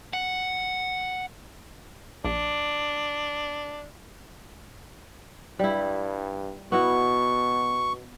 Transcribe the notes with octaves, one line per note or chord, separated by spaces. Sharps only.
F#5
A#1 D4
G2 G3 E4
B2 B3 E4 F#4 C#6